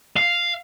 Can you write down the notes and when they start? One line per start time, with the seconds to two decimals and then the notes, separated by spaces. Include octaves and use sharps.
0.16 F5